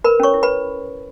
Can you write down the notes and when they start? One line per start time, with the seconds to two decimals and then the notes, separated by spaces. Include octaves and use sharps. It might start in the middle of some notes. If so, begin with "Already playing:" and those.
0.04 A#4 B4 B5
0.20 C#4 C#5 C#6
0.34 E4
0.43 B4 B5